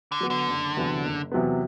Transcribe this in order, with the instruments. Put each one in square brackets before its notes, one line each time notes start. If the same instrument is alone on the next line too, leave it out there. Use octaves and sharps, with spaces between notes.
[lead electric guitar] D3
[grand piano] F#3 B3 F#4
[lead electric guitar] D3
[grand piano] F#1
E2 C3 F#3 B3
F#1
E2 C3 F#3 B3